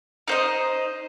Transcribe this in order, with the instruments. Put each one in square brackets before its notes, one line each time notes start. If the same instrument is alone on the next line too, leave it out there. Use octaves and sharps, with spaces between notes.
[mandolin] D#4 C5 D#5